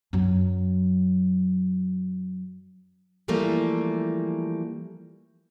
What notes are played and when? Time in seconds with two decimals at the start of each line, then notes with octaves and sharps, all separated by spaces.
0.13 F#2 F#3
3.28 E3 F3 G3 A3 A#3